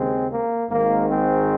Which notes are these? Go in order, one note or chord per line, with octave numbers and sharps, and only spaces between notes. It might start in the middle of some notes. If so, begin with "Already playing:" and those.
Already playing: D#2 C#3 G#3 C4
A#3
G#1 G#2 D#3 A#3
G#3 C4